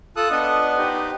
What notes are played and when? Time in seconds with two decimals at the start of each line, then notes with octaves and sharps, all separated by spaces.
0.16 F4 A4 D#6 F#6
0.31 B3 D4 D#5
0.78 D#4 G4 C5